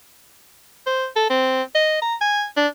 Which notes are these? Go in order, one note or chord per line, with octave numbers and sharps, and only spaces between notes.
C5
A4
C4
D#5
A#5
G#5
D4